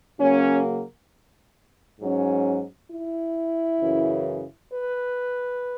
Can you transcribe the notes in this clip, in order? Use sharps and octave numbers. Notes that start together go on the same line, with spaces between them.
C#3 F#3 A#3 C#4
G#2 F#3 C#4
E4
F#2 C#3 E3
B4